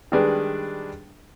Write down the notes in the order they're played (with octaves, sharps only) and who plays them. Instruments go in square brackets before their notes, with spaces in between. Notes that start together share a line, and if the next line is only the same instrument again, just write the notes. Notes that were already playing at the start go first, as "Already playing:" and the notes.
[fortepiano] D#3 G3 G#3 D4 G#4 B4